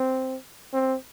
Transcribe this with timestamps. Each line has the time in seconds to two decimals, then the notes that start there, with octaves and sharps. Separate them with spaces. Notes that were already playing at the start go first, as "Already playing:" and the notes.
Already playing: C4
0.73 C4